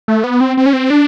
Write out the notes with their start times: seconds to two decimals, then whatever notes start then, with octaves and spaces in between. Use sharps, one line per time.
0.08 A3
0.24 B3
0.41 C4
0.57 C4
0.66 C#4
0.73 C4
0.90 D4